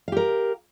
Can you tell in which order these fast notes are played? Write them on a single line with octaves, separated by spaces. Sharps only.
F5 G4 A#4